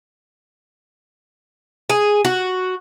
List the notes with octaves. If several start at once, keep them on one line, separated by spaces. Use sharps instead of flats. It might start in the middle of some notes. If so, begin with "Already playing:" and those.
G#4
F#4